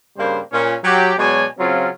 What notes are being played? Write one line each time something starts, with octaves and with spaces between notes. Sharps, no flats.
G2 C#3 G3 A#3 C5
A#2 C#4
F#3 G4
B2 F#3 G#3 C#5 D5 G#5
C#3 F#3 C4 F4